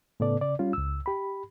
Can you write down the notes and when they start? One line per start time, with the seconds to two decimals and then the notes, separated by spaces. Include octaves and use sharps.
0.20 A2 C#3 B3 A4 D5
0.41 C#3 D5
0.59 G3 C#4 F4
0.73 C#2 E6
1.06 G4 B5